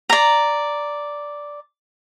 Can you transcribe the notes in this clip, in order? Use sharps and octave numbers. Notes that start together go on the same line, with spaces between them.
D5 A#5